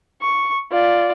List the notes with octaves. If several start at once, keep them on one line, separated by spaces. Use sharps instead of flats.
C#6
F4 D5